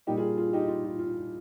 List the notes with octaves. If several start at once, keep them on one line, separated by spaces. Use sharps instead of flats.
A#2 G3 A#3 D#4 G4
F4 G#4
F4 G#4
D#4 G4
F4
F4
F4